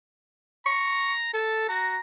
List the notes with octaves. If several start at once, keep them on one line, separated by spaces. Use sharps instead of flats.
A#5 C#6
A4 A5
F#4 A#5